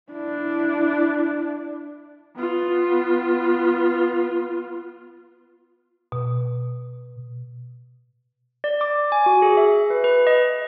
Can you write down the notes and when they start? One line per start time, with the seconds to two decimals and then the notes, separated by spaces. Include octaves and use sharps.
0.12 D4 E4
2.36 B3 F4
6.12 B2
8.64 D5
8.81 D6
9.12 G#5
9.26 F#4
9.42 G#4
9.57 E5
9.90 B4
10.04 B4
10.27 D#5